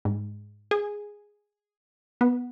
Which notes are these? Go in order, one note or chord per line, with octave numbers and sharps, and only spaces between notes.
G#2
G#4
B3